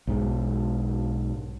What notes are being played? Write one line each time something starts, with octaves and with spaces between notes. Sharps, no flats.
B1 G#2